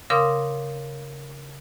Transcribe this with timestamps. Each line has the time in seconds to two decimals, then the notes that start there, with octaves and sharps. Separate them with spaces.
0.10 C#3 A#4 F5 C6 D6 D#6